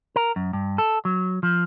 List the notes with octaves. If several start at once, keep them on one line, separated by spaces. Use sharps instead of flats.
A#4
F#2
G2
A4
F#3
F3